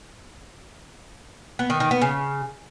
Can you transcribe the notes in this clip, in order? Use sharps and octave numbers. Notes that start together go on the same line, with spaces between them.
B3
D#3
D#3
B3
C#3